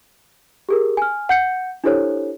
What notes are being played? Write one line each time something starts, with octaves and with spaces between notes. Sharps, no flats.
G4 G#4 A#4
G#5 F6
F#5 G6 C#7
D4 E4 G4 A4 C5 C#5